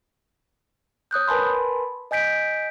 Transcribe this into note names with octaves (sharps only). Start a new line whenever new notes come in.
C#5 D#6 F#6 G6
A#4 B4 G#5 A5 B5 C6
D#5 G#5 G6 B6 D7